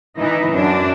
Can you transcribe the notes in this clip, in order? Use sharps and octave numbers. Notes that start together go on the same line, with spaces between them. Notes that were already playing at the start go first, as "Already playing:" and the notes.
E3 D#4
F#2 D4